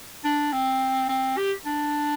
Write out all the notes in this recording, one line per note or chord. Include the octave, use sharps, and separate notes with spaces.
D4
C4
C4
G4
D4